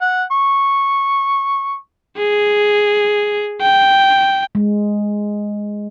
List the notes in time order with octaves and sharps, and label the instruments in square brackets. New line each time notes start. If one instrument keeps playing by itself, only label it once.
[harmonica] F#5
C#6
[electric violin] G#4
G5
[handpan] G#3